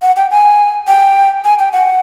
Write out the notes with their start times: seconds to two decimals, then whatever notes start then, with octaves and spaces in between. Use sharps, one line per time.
0.02 F#5
0.16 G5
0.31 G#5
0.87 G5
1.44 G#5
1.59 G5
1.73 F#5